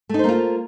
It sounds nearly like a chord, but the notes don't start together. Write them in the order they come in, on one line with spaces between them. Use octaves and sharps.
A3 D#4 C5 A#3 F4